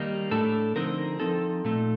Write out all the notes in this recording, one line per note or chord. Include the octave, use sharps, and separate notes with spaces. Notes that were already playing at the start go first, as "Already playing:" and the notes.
Already playing: D#3 G3 A#3 D#4
A2 A3 D4 A4
D3 F3 C4 D#4 A#4
F3 C4 D#4 A4
A#2 A3 D#4